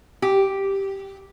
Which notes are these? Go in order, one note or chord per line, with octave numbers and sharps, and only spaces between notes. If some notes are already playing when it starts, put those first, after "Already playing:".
G4